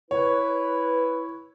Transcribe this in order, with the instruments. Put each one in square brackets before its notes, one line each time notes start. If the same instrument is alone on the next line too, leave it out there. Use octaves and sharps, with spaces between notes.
[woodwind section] E4 B4 [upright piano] C#5